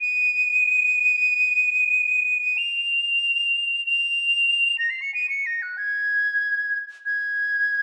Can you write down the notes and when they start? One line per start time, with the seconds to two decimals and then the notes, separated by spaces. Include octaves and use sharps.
0.01 D#7
2.57 F7
3.86 F7
4.78 A#6
4.90 C7
5.02 C#7
5.14 D#7
5.29 C#7
5.46 A#6
5.62 F#6
5.78 G#6
7.06 G#6